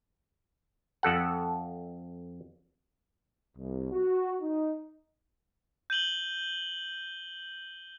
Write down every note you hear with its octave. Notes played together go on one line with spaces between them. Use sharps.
F2 A4 F#5
C2
F#4
D#4
G6 D#7 F#7 G7